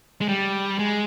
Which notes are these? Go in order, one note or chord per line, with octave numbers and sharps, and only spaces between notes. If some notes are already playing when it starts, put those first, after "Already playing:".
G#3
G3
G#3